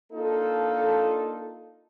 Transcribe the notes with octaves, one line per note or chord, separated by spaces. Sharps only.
A#3 D4 D#4 F4 A4